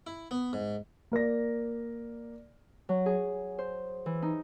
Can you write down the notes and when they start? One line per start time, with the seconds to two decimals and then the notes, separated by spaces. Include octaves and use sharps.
0.07 E4
0.31 B3
0.53 G#2
1.12 A#3 A#4 D5 A#6
2.89 F#3
3.06 G#4
3.59 C5
4.06 E3
4.22 D#4